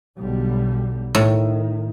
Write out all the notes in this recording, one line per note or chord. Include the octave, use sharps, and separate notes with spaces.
B1 D3 G3
A2 D#3